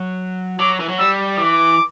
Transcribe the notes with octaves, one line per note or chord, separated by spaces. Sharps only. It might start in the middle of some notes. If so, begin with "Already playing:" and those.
Already playing: F#3
F#3 D6
E3
F#3
G3 E6
E3 D6